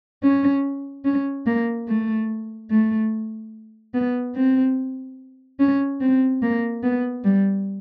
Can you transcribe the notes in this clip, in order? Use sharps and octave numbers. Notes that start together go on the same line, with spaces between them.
C#4
C#4
A#3
A3
A3
B3
C4
C#4
C4
A#3
B3
G3